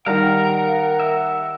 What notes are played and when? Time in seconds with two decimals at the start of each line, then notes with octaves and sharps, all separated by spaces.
0.06 D#3 G3 A#4 F5 F#5 A#5
1.00 E5